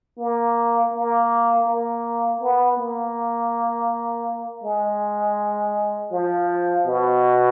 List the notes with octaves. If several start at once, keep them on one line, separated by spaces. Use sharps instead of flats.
A#3
A#3
A#3
B3
A#3
G#3
F3
B2